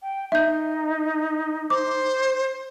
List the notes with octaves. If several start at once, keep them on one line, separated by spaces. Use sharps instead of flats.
G5
D#4 E5 G6
C5 D6